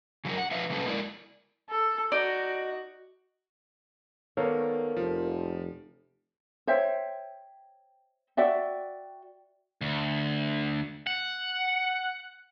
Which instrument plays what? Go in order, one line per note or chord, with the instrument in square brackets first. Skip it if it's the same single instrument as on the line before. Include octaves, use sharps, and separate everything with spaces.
[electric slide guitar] C#3 F#3 F#4 A#4
F#5
F3 B4 E5 F5
A#2 C#3 F#3 C#4 A4 B4
G#3 A#3 E4 A#4 D5
[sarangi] A4
[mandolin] D#4 D5 [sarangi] F#4
[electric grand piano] D#3 B3 [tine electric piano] A4 A#4 F5 [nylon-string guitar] C#5 D5
[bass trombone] F1 [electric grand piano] F3
[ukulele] C5 C#5 E5 G5
F#4 D5 E5 G5
[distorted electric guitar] D2
F#5